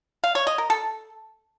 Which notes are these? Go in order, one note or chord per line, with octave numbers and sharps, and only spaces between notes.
F5
C#5
D#5
A#4
A4